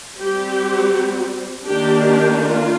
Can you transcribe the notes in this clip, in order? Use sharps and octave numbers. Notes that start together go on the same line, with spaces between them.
G3 C4 G4
D#3 A#3 D4 G4
G4
F4